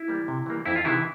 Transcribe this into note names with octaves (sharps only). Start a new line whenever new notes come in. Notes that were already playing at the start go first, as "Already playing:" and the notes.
Already playing: E4
E3 G3 A#3
C3
E3 G3 A#3
F2 E4
F4
C3 D#3 E3 G#3 E4